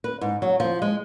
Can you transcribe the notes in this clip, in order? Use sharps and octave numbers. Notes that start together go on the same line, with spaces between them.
B4
G#2
F#3
F3
G#3